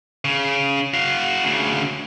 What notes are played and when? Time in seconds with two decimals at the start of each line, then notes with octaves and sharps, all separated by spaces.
0.25 C#3
0.94 F#4 F5
1.44 D2 C#3